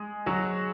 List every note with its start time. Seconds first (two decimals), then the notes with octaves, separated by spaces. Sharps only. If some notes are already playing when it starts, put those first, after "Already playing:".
Already playing: G#3 G#4
0.26 F#3 F#4